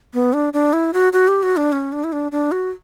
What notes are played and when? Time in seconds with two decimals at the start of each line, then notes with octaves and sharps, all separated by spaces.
0.14 B3
0.33 D4
0.53 D4
0.73 E4
0.93 F#4
1.13 F#4
1.28 G4
1.43 F#4
1.57 D4
1.72 C#4
1.92 D4
2.04 E4
2.12 D4
2.32 D4
2.52 F#4